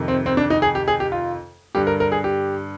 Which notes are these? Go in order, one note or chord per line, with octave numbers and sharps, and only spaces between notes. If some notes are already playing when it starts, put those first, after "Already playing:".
Already playing: F2 C3 D#3
C4
C4
D4
D#4
G#4
G4
G#4
G4
F4
G2 D3 G4
A#4
A#4
G#4
G4